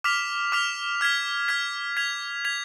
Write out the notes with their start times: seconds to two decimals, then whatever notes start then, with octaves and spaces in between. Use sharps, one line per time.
0.04 D6 F6 B6 F7
0.52 D6 F6 B6 F7
1.01 F6 G#6 B6
1.48 F6 G#6 B6
1.97 G#6 B6 F7
2.45 G#6 B6 F7